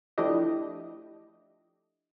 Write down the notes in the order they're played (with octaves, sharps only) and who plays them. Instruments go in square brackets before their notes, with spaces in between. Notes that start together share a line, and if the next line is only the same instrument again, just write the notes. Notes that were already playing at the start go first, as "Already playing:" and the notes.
[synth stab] F3 A3 D4 E4 G4 D#5